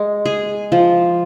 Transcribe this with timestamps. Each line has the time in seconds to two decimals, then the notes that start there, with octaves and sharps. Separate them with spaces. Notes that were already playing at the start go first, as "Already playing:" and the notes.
Already playing: G#3
0.26 G#4
0.72 F3